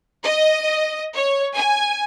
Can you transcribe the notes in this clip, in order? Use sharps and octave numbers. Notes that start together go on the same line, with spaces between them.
D#5
C#5
G#5